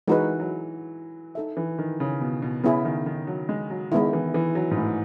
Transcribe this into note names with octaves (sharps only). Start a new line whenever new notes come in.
E3 G#3 D#4 F#4 B4
F#3
D#4 A4 E5
E3
D#3
C#3
B2
B2
C#3 B3 E4 G#4
D#3
D#3
F#3
G#3
F#3
D#3 G#3 B3 E4
E3
E3
F#3
G#2
A2